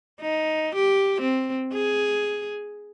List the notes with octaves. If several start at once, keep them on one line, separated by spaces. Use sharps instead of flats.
D#4
G4
C4
G#4